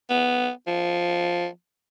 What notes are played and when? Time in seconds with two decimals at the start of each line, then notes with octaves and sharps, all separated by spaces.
0.10 B3
0.67 F3